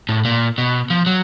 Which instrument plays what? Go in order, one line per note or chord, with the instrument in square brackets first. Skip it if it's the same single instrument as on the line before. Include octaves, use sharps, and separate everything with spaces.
[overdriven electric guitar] A2
A#2
B2
F3
F#3